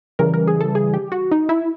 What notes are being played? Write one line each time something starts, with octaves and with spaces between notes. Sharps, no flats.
C#3 E3 G3 A#4
A#4
G#4
A4
G#4
G4
F#4
D#4
E4